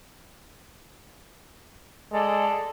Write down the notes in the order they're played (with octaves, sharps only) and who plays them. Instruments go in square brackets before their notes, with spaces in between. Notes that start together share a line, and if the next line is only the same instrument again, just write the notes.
[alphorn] G#3 [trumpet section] A4 D5